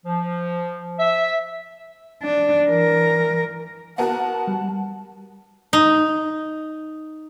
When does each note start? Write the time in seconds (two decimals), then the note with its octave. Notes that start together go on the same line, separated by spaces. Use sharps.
0.06 F3
0.99 E5
2.23 D4
2.66 E3 A#4
3.98 B3 F#4 A#4 F#5 A5
4.47 G3
5.73 D#4